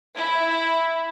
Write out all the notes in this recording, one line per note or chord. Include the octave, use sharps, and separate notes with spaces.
E4